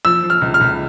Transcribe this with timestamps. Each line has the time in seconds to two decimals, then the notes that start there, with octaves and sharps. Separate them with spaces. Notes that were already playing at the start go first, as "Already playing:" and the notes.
0.05 F3 E6
0.23 F3
0.30 F6
0.42 C#2
0.54 F6
0.61 C#2